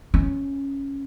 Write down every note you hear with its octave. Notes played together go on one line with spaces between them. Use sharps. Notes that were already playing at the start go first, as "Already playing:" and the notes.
C#4